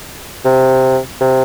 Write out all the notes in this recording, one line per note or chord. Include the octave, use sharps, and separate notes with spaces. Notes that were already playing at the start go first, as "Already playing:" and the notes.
C3
C3